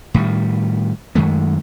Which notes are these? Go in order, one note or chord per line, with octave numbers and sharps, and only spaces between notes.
A2 D#3 G3
F#2 D#3 G#3 A3